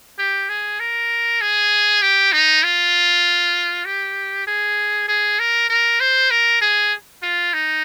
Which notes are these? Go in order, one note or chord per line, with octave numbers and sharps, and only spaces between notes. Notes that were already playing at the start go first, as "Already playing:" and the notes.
G4
G#4
A#4
G#4
G4
D#4
F4
G4
G#4
G#4
A#4
A#4
C5
A#4
G#4
F4
D#4